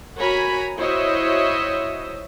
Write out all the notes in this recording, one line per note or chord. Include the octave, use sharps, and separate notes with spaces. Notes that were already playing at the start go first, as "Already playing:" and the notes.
F#4 A#4 C#5 G#5 A#5 B5
E4 F#4 C5 C#5 D#5 E5